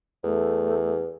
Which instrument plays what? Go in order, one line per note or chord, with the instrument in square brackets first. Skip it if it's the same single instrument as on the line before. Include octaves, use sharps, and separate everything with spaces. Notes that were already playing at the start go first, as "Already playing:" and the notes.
[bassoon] E2 [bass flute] A3